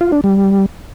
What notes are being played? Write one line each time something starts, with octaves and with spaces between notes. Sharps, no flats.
F4
D4
G3